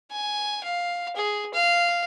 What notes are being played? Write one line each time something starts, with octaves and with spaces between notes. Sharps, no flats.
G#5
F5
G#4
F5